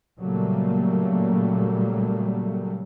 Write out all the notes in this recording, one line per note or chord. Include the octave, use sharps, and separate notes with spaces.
A#2 C#3 F#3 G3 A3 A#3